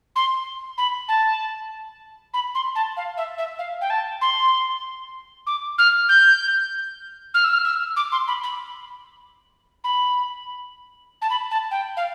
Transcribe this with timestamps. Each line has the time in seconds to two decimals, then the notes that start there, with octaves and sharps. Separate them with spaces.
0.16 C6
0.78 B5
1.08 A5
2.34 B5
2.55 C6
2.75 A5
2.97 F5
3.17 E5
3.38 E5
3.59 F5
3.81 G5
3.90 A5
4.21 C6
5.47 D6
5.78 F6
6.09 G6
7.34 F6
7.44 E6
7.53 F6
7.65 E6
7.96 D6
8.12 C6
8.28 B5
8.43 B5
9.84 B5
11.22 A5
11.30 B5
11.51 A5
11.71 G5
11.97 F5